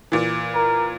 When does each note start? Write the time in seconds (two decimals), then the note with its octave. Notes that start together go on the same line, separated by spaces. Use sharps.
0.12 A#2 E3
0.54 A#4